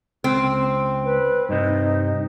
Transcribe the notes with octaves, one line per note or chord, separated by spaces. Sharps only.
C#2 C4
B4
G2 C3 D#4